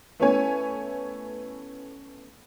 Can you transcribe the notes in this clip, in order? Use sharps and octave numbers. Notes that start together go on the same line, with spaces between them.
A3 B3 C#4 E4 C#5 G#5